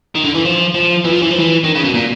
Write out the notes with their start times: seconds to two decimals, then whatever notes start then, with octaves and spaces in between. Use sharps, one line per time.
0.15 D#3
0.24 D3
0.34 E3
0.45 F3
0.74 F3
1.05 E3
1.13 F3
1.22 E3
1.31 F3
1.39 E3
1.64 D#3
1.75 C#3
1.84 B2
1.94 A#2